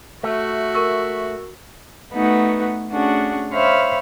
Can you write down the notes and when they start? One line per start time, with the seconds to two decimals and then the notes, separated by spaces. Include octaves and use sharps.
0.24 A3 F#4 E5
0.74 A#4 C#6 E6
2.13 A3 B3 D#4 F#4 B4
2.90 A3 C#4 D4 F#4 G#4
3.53 C5 C#5 E5 F5 B5 F6